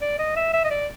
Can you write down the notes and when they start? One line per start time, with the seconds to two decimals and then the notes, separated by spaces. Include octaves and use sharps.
0.01 D5
0.19 D#5
0.36 E5
0.54 E5
0.64 D#5
0.71 D5